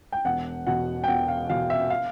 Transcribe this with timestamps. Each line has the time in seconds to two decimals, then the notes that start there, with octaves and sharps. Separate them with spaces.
0.12 G5
0.25 E1 F#5
0.67 E2 B2 F#5
1.04 G5
1.08 E1 F#5
1.28 F5
1.49 E2 B2 F5
1.70 E5
1.90 F5